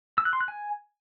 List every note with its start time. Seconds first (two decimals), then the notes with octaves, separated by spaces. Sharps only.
0.18 E6
0.25 F#6
0.33 C6
0.41 F#6
0.48 G#5